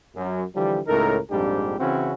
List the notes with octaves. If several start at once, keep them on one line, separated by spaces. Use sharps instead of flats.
F#2
D3 E3 F3 G3
C#2 A2 D#4 A4 A#4
A#1 F2 G#2 G3 D4 G4
C#3 E3 C4 C#4 E4 F#4